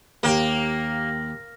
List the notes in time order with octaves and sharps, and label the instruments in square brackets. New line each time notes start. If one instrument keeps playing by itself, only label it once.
[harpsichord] D#2 G4 D6 [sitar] A#3